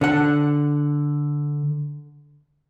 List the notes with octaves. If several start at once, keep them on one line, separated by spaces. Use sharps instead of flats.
D3 F#5